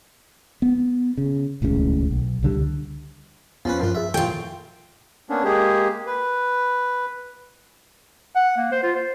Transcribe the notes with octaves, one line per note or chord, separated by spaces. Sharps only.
B3
C#3
D#1 C#2 A2 C#3
B1
C#2 D3 G3
E2 F3 C#4 B4
G2 F3 F4 A#4 C5
F4 G#4 E5
A#1 F4 A4 C#5 G5
A#3 B3 C#4 D4
G#3 A#3 G4 G#4
B4
F#5
A#3
C5
F4
C5